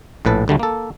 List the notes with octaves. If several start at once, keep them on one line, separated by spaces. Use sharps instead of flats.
A#1 A2 B4 A5
D2 D3 G3 A3
A#3 A4